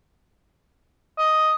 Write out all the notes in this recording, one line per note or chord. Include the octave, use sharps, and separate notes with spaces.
D#5